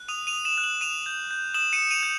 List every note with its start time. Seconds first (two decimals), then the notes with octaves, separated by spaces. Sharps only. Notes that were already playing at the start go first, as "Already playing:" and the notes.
Already playing: F#6
0.08 D#6 D#7 F7
0.27 D#7 F7
0.33 D#6
0.45 E7 F#7
0.58 F#6
0.63 E7 F#7
0.81 D#6 D#7 F7
1.06 G6
1.31 G6
1.54 D#6 E7 F#7
1.73 C#7 D#7
1.78 D#6
1.91 D#7 F7
2.03 G6